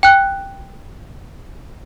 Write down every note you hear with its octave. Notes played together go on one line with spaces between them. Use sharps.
G5 F#6